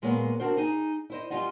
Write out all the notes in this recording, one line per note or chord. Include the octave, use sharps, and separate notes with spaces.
A#2 G#3 A#3 B3 C#5
C4 D4 F#4 A#4 C5
D#4 G#4 G#5
E4 C5 D#5
G3 C#4 F4 D#5 F#5